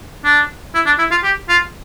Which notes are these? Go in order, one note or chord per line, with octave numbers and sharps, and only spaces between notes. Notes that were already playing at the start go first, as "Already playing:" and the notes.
D4
E4
D4
E4
F4
G4
F4